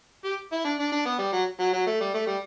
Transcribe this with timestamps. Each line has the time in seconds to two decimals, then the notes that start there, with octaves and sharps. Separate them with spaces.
0.25 G4
0.52 E4
0.65 D4
0.79 D4
0.92 D4
1.05 B3
1.19 G3
1.33 F#3
1.60 F#3
1.73 F#3
1.87 A3
2.01 G3
2.14 A3
2.27 G3